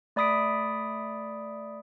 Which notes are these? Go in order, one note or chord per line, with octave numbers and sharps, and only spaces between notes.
A3 D5 B5 D#6 B6 D7